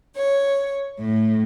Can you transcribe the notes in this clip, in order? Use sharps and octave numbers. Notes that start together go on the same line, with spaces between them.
C#5
A2